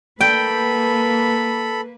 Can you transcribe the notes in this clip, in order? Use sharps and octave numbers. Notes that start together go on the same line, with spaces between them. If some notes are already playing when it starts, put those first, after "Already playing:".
A#3 A4 B4 G5 B5